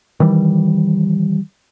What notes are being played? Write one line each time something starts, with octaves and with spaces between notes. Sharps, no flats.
D#3 E3 G3